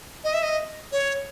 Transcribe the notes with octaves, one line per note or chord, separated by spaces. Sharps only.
D#5
E5
D#5
C#5